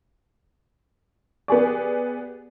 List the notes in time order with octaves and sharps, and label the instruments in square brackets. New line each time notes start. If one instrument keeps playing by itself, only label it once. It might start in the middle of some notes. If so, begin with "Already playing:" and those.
[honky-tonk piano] B3 G4 G#4 D5